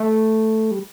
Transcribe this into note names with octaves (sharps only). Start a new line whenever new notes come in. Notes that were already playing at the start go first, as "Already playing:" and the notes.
Already playing: A3
G3